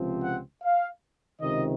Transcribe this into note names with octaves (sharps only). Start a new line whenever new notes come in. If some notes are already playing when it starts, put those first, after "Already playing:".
Already playing: C#2 C3 F3 C4
F#5
F5
C#2 C3 D#3 D#5